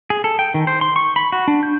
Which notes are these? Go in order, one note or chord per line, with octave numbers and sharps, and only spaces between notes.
G#4
A4
G5
D#3
C5
C6
C#6
B5
F#4
D4
G6